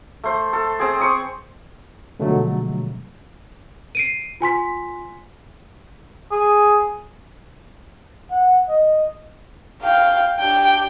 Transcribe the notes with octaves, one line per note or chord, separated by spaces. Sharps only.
A3 C5
A4
C4 G#4
C5 C#6 D#6
B2 D3 F3 F#3 G#3 A3
C7 D7 D#7
F4 G#5 C6 B6
G#4
F#5
D#5
F5 G5
D4 G4 G5